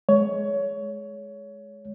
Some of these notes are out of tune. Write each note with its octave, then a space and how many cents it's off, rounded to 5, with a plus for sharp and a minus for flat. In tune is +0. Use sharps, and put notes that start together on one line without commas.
G#3 +20 C#5 +20